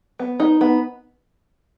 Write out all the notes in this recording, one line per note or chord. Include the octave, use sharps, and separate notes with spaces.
B3
D#4
B3